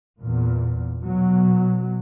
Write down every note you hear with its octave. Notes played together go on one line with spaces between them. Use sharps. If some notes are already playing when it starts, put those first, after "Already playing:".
E2 A#2
B2 F#3